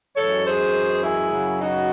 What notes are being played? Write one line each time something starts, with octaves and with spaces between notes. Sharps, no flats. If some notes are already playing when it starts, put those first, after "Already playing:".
F#2 E3 G#3 A4 C#5
G#4 C5
E4 G#4
F#2 C#3 F#3
D#4 F#4